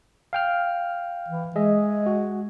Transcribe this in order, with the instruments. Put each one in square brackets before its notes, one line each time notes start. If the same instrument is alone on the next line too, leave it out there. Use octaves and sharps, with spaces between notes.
[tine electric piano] F5 G5 F6
[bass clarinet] E3
[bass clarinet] G#3 [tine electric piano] G#4 D#5 E5
[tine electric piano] F#4